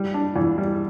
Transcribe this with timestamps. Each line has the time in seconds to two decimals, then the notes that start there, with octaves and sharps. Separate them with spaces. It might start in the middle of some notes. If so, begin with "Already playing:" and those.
Already playing: G3
0.14 D4
0.36 E2
0.58 G3